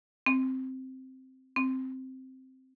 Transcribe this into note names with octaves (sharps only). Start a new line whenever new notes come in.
C4
C4